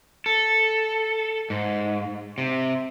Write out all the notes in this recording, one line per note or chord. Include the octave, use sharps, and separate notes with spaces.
A4
G#2
C3